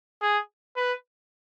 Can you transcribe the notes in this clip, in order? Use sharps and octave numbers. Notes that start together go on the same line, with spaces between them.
G#4
B4